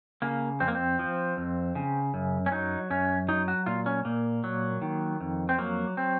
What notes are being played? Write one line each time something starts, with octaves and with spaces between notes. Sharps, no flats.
C#3 A#3
F2 C4
A#3
C4
F3
F2
C#3
F#2
C#4
F#3 D#4
F#2 C#4
F#3 D#4
F#4
A#2 F4
C#4
A#2 A#3
F#3
D#3
F2
C4
F#3 A#3
C4